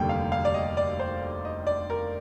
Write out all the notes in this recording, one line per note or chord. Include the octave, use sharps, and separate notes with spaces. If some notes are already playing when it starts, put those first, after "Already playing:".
Already playing: F1 D#2 D3 G3 A#3 G5
F5
F5
D5
D#5
D5
C5
D#5
D5
A#4